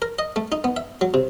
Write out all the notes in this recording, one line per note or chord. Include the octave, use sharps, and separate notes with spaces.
A#4
D#5
A3
D#4
B3
E5
F#3
C3